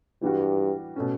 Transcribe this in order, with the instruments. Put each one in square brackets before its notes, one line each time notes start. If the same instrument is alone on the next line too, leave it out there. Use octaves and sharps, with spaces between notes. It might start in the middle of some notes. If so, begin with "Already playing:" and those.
[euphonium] G2 [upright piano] E3 G3 D4 F#4
[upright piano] B2 A3 C#4